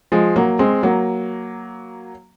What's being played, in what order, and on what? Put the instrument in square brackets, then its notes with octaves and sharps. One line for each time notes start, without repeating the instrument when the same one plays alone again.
[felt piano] F3 G#3
F#3 A#3
G#3 C4
F#3 A#3